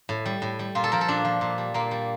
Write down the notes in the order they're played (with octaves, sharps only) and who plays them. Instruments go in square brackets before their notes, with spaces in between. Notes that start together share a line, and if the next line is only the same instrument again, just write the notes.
[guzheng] A2
G3
A2
G3
A#2 F4
A4
F3 A#4
A4
A#2 D4
F3
A#2
G3
A#2 A#3
G3